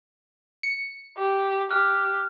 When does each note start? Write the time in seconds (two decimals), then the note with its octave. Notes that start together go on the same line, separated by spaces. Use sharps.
0.63 C#7
1.18 G4
1.71 G4 F6 F#6